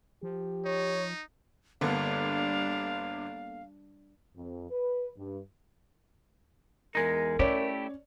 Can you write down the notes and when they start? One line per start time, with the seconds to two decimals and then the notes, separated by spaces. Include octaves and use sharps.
0.23 F3 G4
0.65 D#4 C#5
1.81 G1 D3 G3 A#3 B3 D4 A4 F5
4.36 F2
4.70 B4
5.17 G2
6.95 E2 G#3 D#4 A#4
7.39 A3 C#4 E4 G4 C#5 D5